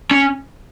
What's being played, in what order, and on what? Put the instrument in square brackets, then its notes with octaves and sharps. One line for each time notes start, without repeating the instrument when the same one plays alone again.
[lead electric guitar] C#4